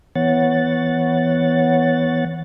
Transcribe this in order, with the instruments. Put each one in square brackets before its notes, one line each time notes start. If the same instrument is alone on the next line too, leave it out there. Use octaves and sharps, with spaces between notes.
[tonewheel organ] E3 B3 C#5 F#5 A6